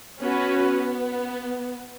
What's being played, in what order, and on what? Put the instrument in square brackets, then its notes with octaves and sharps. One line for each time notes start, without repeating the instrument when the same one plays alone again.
[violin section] B3 [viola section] C#4 F#4 B4
[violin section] B3